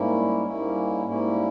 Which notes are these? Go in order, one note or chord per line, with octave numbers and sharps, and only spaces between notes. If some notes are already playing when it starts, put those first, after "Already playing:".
Already playing: G#2 G3 A#3 C#4 E4
G#2 G3 A#3 C#4 E4
G#2 G3 A#3 C#4 E4